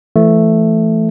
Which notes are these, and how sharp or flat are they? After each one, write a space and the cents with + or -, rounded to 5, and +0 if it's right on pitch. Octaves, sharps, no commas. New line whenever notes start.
E3 +30 A3 +0